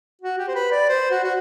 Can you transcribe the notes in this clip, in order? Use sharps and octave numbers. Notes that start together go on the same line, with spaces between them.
F#4
G4
C5
B4
D5
C5
F#4
F#4